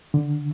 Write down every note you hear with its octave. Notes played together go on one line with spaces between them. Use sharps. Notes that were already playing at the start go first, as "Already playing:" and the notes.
D3